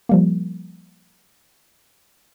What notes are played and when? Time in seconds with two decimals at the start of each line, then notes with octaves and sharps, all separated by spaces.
0.09 F3 G3 A#3